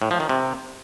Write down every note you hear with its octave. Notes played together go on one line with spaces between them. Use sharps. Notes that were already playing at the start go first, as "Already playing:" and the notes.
A2
F3
D#3
C3